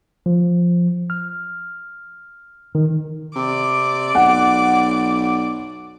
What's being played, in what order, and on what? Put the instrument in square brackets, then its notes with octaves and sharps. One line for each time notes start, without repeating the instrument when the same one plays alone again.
[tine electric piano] F3
F6
D#3
[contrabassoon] C3 [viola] D5 D6
[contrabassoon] B1 [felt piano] F#5